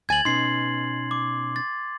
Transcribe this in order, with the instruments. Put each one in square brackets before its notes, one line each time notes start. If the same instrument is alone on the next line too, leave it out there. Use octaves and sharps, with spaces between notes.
[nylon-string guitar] D2 G#5 [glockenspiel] G#6 A6 F#7
[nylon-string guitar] B2 C#4 D#4 [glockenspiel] C6 C7
[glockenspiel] D6
A6